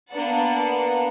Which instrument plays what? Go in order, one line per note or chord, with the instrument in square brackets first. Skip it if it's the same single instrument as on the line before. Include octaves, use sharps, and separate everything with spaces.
[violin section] A#3 B3 D4 F#5 A5